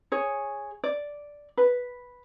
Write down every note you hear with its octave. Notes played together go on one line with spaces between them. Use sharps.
G#4 C#5
D5
B4